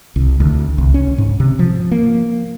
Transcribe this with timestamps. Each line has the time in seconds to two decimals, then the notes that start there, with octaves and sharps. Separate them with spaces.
0.16 C2
0.40 D2
0.78 C2
0.94 C#4
1.18 G#2
1.40 C3
1.59 F3
1.92 A#3